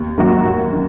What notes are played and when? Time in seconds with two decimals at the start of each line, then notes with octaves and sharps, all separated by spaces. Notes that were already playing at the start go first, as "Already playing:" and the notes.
Already playing: D#2
0.18 D#3 F#3 A#3 F#4
0.45 D#2
0.73 D#3